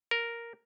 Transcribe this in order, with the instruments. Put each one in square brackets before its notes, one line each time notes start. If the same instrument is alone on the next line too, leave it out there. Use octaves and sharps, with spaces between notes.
[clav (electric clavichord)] A#4